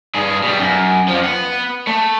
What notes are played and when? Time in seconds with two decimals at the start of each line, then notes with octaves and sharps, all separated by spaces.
0.15 G2 G#4
0.43 B2 G3
0.60 F#2
1.08 F2 F3
1.23 B3 F#5
1.87 A3